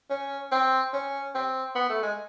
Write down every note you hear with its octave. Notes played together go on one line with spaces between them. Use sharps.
C#4
C4
C#4
C4
B3
A3
G#3